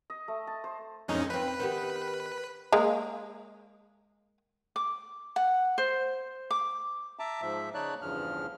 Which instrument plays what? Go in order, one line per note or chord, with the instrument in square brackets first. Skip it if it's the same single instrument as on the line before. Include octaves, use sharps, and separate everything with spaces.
[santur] D#5
A3
A5
C5
[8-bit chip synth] F2 C#4 D#4 [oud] A#2 G#3
[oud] C4 F4 [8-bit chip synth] B4
[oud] D#3 B3 G4
[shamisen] G#3 A#3 G#4
[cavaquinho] D6
F#5
C5
D6
[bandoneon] E5 A5 A#5 D6
G#2 F3 E5
C#3 D#4 C#5 D5 A5 F#6
E2 G2 C#3 F3 F6